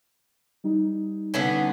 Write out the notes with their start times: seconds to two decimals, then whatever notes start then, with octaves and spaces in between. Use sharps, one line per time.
0.64 G3 D#4
1.34 D3 B3 C#4